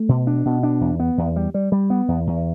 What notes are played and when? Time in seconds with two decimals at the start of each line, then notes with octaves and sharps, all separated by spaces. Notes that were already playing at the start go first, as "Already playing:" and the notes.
Already playing: A3
0.09 B2
0.27 D4
0.45 B2
0.63 D4
0.81 E2
1.00 B3
1.18 E2
1.36 G3
1.54 G3
1.72 G3
1.90 B3
2.08 E2
2.27 E2